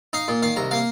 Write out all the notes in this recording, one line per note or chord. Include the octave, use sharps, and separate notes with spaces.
D#4 F5
A#2
D#3 F5
C2 A#5
A#3 F5